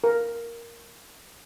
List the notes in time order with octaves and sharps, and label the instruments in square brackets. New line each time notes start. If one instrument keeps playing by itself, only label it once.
[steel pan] A#4